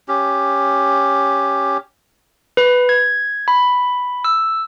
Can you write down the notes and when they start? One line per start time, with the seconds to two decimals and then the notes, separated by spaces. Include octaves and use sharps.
0.08 C#4 G4
2.57 B4
2.89 G#6
3.48 B5
4.25 E6